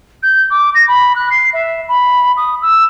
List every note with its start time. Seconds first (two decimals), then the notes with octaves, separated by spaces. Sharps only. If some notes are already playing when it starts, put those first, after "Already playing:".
0.23 G6
0.50 D6
0.75 A#6
0.87 B5
1.16 F#6
1.31 C7
1.53 E5
1.88 B5
2.37 D#6
2.62 E6